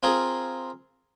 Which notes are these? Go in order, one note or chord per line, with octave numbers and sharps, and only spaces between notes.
C4 F4 G#4 A#4